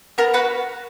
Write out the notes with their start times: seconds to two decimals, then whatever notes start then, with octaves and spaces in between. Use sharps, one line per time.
0.18 B3 A#4
0.34 F#4 B4